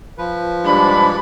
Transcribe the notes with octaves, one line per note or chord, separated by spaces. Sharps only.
F3 B4
G#2 G3 D4 B5